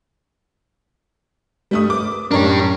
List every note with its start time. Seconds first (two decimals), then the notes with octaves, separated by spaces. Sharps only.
1.71 G2 G3 A3 D#6
1.90 A#4 B4 D6
2.31 F#2 A2 D4 G4 A#4 C#5